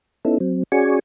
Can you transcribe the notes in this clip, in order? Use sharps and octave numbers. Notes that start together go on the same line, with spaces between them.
B3 C#4 D#4 E4 A4
F#3 C4
C#4 F#4 G#4 D5 G#5 C#6